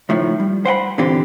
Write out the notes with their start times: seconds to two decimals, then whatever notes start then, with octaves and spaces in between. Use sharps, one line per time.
0.09 C#2 A2 D#3 F3
0.40 G3
0.65 C5 F#5 G5 B5
0.98 A#2 D3 E3 C4 G4